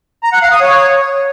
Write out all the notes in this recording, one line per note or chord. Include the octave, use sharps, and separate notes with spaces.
A#5
F#5
F5
D#6
C#5